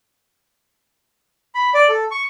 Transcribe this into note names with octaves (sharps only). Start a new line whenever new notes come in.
B5
D5
A4
C#6